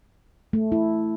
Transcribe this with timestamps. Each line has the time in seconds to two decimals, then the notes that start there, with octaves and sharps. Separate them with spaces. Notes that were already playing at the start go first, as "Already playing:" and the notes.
0.53 A3
0.72 E4